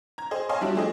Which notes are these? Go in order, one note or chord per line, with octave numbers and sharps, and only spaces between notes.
A#5 G#6
G#4 C5 D#5
C#5 D#5 F5 G#5 A5 C6
G3 D4 E4 F#4 G4
F3 A3 G#4 D#5